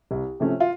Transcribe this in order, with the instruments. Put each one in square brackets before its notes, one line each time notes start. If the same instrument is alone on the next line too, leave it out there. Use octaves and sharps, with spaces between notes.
[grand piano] C2
C3 F3 A3 C#4
[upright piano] F4